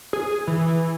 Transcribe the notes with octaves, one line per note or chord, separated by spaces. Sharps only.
G#4
E3